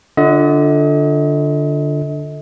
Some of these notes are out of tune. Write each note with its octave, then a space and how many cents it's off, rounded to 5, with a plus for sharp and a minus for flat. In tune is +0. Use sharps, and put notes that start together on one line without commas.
D3 +0 F4 +10 D#5 +40